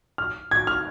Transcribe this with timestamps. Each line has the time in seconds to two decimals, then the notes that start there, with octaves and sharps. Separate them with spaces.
0.18 F6
0.51 G#6
0.67 F6